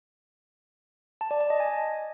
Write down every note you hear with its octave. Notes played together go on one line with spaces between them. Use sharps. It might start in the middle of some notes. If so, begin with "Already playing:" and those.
A5
D5
A5
D#5
G#5